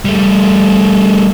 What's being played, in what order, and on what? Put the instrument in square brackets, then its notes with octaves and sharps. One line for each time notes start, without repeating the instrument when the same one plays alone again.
[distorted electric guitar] G3 A3